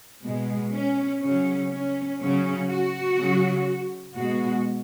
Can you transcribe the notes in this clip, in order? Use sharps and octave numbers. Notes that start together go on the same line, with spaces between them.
B2 G#3
C#4
C#3 F#3 C#4
C#4
C#3 F#3 C#4
F#4
C#3 F#3
B2 G#3 F#4